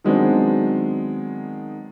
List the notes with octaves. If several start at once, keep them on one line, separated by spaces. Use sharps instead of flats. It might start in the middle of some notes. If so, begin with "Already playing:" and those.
D#3 F#3 G#3 B3 C4 D4